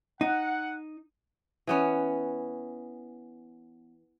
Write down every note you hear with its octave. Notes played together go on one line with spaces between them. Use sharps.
D#4 F#5
E3 B3 C#4